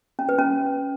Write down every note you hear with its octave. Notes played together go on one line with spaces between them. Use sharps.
C#4
B4
C#4